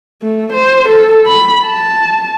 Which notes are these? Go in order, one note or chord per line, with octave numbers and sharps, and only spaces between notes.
A3
C5
A4
B5
A5